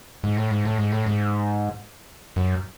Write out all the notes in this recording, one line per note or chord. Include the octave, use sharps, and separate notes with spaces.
G#2
A2
G#2
A2
G#2
A2
G#2
F#2